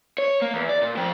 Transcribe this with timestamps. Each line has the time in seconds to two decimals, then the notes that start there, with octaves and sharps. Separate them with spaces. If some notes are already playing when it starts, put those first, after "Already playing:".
0.18 C#5
0.42 A#3
0.54 E2
0.69 D5
0.82 A#2
0.97 F3 G5